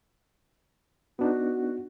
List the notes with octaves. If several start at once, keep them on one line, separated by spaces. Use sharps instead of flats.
B3 D4 D#4 F#4